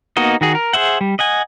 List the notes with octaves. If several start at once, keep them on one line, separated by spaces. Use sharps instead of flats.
A#3 B3 D#4 F#4 D#5
D#3 F#4 G#4
A#4
G#4 C5 E5 F#5
G3
D#5 F#5 G#5